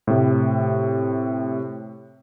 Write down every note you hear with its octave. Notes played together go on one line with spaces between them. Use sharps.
A2 C3